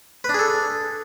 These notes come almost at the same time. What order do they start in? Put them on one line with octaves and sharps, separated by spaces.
B4 D4 G#4 A4